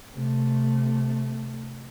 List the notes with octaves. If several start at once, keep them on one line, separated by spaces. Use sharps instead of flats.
C3 A3